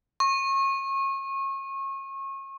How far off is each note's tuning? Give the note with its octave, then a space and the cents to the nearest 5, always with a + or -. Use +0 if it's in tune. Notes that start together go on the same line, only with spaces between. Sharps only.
C#6 -30